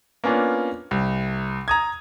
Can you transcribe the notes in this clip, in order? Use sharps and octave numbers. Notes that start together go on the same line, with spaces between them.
A#3 B3 C#4 D4 F4
C2
A#5 D#6 G#6